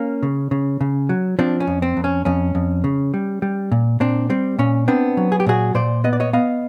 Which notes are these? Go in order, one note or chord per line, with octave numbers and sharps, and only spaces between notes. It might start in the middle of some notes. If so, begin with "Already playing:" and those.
Already playing: A#3 C#4
C#3
C#3
C#3
F#3
F3 C4 D4
C#4
F2
C4
F2
C#4
F2 C#4
F2
C#3
G3
G3
A#2
A#2 C4 D4
G3 C4
A#2 C#4
B3 C4 D4
F#3
G#4
G4
A#2 F#4 G#4
A#2 C5 D5
B3 D#5
D5
C#5 D#5
B3 D#5 F5